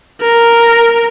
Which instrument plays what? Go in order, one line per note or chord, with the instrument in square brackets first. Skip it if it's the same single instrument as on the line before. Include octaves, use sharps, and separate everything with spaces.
[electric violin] A#4